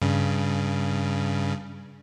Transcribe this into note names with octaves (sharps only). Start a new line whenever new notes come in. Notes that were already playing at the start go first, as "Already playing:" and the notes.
G2 C#3